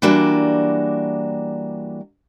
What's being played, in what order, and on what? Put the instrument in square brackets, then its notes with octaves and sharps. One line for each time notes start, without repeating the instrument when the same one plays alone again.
[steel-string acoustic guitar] E3 G3 A#3 D4 F#4